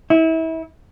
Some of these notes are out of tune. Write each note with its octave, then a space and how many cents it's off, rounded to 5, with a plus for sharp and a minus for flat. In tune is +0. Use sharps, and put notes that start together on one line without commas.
E4 -30